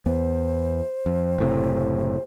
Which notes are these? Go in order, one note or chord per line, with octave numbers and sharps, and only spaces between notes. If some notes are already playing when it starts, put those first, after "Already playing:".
E2 B3 C5
F2
F#1 A2 C3